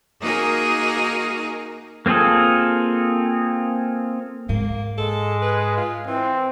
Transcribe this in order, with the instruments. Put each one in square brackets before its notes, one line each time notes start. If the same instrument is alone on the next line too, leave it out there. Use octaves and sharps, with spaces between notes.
[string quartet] A#3 D#4 F#4 G#4 A#4
[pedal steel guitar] A#3 C4 F4 G#4 A4
[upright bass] G#2 [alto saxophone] A#3
[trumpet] G#3 [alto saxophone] A4
[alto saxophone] B4
F4
[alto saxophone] E3 [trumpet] C4